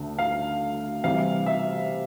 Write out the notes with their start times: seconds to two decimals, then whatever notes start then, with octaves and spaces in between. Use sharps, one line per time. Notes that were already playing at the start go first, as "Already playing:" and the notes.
Already playing: D2 D3 A3
0.19 F5
1.04 C3 E3 G3 F5
1.46 E5